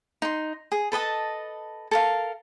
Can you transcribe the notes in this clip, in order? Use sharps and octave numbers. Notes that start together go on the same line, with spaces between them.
D#4 C6
G#4
A4 B4 D#5 A5
A4 A#4 F5